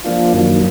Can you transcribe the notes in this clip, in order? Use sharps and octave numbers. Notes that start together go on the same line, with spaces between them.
F3 A#3 D4 F4
F#2 D#3 F#3 A#3